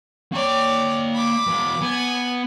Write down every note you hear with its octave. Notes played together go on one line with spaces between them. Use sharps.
A#3 C#5 D5 G5
B5 D6
E3 F#4
B3 G#5